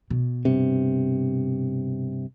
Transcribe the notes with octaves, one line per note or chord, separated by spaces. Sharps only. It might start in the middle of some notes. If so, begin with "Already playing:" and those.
B2
G2 C3